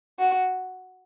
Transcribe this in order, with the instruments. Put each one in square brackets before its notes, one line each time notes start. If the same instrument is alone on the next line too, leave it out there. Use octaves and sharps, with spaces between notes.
[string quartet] F#4